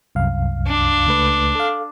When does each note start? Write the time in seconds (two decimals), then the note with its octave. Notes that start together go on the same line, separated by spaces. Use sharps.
0.15 C2 F#2 F5
0.67 D4
1.07 C#2 A3 B4
1.55 A4 F5